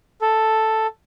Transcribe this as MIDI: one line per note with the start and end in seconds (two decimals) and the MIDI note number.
0.22 0.87 69